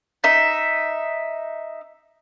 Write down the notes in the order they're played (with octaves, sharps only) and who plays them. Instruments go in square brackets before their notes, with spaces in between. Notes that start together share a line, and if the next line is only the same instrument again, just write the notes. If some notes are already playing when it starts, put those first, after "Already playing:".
[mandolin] D#4 E5